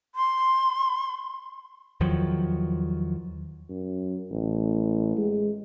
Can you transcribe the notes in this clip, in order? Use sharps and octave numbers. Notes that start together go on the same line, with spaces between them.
C6
E2 D#3 F3 F#3
F#2
A1
G#3